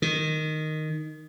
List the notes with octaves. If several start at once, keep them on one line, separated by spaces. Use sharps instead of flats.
D#3